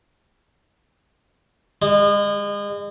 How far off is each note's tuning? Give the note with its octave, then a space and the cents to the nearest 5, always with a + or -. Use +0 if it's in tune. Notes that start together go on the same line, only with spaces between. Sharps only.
G#3 -35